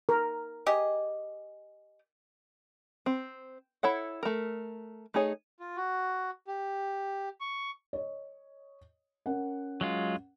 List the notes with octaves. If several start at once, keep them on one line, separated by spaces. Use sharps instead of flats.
A#4
G4 G#4 D#5
C4
E4 A4 C#5 F#5
A3 A#4
A3 D#4 G#4 C#5
F4
F#4
G4
C#6
C#5 D#5
C#4 A#4 F#5
F#3 G#3 F4